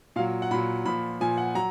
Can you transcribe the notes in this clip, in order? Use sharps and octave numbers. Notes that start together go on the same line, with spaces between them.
A#2 F#3 F5
F#5
A#2 F#3 B5
A#2 F3 B5
A#2 F3 G#5
F#5
F#3 A#5